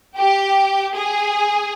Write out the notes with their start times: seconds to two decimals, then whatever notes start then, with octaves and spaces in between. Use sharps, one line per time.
0.17 G4
0.95 G#4